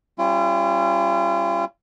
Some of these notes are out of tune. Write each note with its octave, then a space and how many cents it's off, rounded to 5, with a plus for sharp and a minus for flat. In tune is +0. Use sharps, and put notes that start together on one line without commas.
G3 +0 C#4 -25 F4 -40